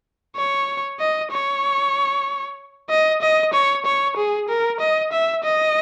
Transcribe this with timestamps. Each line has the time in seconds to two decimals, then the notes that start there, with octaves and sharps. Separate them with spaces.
0.36 C#5
1.00 D#5
1.32 C#5
2.90 D#5
3.22 D#5
3.53 C#5
3.86 C#5
4.17 G#4
4.49 A#4
4.80 D#5
5.12 E5
5.44 D#5